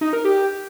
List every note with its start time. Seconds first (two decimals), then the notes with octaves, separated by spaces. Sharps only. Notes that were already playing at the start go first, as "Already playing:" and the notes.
0.01 D#4
0.13 A#4
0.25 G4